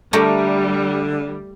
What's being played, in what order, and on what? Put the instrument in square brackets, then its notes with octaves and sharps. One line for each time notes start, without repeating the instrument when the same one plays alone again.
[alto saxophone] D3 [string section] G3 [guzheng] A3 G4 A#4